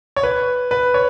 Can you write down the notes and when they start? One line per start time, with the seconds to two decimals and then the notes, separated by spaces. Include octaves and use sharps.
0.16 C#5
0.23 B4
0.71 B4
0.94 C#5